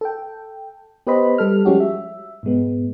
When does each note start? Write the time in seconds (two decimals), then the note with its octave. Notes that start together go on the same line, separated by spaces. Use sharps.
0.01 A4 G5
1.07 B3 G4 B4 C5 D#5 B5
1.38 G3 A4 F6
1.65 F3 G3 G#3 C#4 F#4 G4
1.80 E5
2.43 G#2 B2 G#3 B3